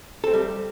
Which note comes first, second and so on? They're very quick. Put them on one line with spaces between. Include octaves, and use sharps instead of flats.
A4 C4 A3 G3